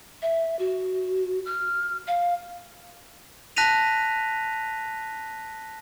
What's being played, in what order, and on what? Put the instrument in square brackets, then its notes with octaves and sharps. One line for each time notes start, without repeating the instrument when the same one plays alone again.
[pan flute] E5
F#4
F6
F5
[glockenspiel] A5 F#6 A#6 B6 D#7 F7